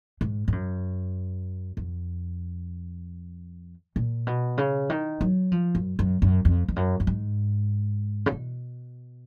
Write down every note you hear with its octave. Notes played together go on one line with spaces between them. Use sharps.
G#2
G#2
F#2
F2
A#2
B2
C#3
D#3
F#3
F3
F#2
F#2
F#2
F2
F2
F#2
F#2
G#2
C#3
B2